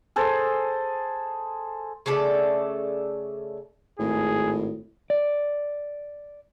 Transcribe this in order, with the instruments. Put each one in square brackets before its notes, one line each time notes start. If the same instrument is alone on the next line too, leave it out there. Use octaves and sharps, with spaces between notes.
[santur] G#4 A4 C5
[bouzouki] C#3 A3 A4 D5
[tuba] G#1 [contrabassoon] A2 [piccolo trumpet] G#4
[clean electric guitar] D5